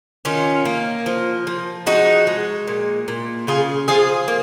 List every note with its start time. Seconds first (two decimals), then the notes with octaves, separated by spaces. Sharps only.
0.25 D#3 C#4 F4
0.65 A#3
1.06 F3
1.47 F3
1.86 G#3 D#4 F#4
2.27 G#3
2.67 A#2
3.08 A#2
3.47 C#3 F4 G#4
3.88 F3 F4 G#4
4.28 A#3